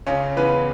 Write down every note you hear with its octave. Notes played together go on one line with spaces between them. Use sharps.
C#2 C#3 C#4
C#3 E3 B3 B4